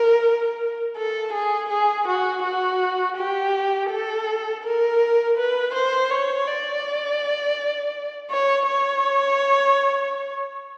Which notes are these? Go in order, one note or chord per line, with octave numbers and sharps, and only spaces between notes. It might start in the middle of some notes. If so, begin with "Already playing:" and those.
Already playing: A#4
A4
G#4
G#4
F#4
F#4
G4
A4
A#4
B4
C5
C#5
D5
C#5
C#5